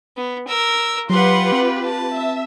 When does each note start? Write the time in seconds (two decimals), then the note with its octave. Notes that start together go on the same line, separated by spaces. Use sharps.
0.17 B3
0.48 A#4 E6
1.10 F#3 F4 G4 B4 F#5 C6
1.52 C4
1.85 A5
2.15 E5